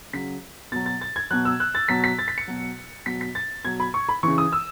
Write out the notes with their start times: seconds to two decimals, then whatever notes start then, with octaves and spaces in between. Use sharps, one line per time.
0.13 C#3 F#3 B6
0.72 B2 F#3 A6
0.86 A6
1.01 A6
1.16 G#6
1.31 B2 F#3 F#6
1.45 E6
1.60 F#6
1.75 A6
1.88 B2 F#3 B6
2.04 B6
2.19 A6
2.28 B6
2.38 C#7
2.47 B2 F#3
3.06 B2 F#3 B6
3.21 B6
3.35 A6
3.64 B2 F#3 G#6
3.80 B5
3.94 C#6
4.09 B5
4.23 C#3 E3 C#6
4.38 D#6
4.52 E6